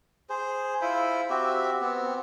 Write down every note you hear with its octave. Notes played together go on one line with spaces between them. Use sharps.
G#4 C5
E4 F4 C5 B5
C4 F#4 G4 E5
B3 C4